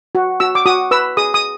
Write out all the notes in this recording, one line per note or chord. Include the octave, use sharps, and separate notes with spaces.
F#4
F#4 E6
D6
F#4 D#6
B4 E6
G#4 D#6
D#6